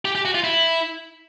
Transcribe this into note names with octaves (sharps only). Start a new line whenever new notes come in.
G4
G4
F#4
F4
E4